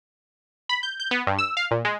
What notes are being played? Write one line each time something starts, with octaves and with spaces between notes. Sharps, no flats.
B5
G6
G6
B3
G2
E6
F5
A#2
G#3